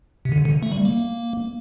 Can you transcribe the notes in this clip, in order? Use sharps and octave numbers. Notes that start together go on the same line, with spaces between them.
C3
D3
D3
A3
G3
A#3